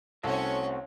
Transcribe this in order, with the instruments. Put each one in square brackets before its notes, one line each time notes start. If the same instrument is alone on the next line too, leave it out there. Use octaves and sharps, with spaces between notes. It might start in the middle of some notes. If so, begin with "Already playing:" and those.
[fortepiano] C2 [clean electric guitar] A3 C4 F#4 [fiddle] C#4 C#5 [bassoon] A4